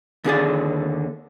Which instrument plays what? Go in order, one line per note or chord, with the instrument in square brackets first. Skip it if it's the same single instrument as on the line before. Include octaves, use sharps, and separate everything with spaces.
[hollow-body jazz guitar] D#2 D3 G#4 D5